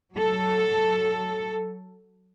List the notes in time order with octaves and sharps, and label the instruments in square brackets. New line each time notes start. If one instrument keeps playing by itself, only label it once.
[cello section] F#3 A4